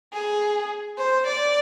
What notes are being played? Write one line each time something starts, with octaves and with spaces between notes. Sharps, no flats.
G#4
C5
D5